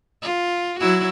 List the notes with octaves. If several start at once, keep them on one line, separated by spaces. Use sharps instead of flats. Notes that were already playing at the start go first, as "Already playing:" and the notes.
F4
F#3 E4 F#4